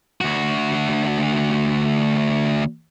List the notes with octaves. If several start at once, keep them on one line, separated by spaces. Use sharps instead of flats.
D2 F#4